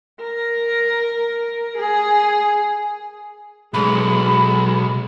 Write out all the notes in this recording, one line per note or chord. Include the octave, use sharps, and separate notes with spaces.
A#4
G#4
B1 G#3 B5